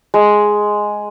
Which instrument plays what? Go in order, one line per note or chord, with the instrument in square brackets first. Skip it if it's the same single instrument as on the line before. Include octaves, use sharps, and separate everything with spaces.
[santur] G#3